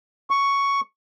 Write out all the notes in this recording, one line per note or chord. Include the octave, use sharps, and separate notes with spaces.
C#6